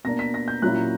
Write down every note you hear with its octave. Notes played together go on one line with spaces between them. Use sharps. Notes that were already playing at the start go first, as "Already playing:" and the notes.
B2 A#3 D4 A#6
B6
A#6
G6
A#2 F#3 A#3 C#4 E4 F#6